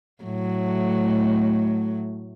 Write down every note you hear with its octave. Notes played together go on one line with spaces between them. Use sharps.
A2 F#3 A3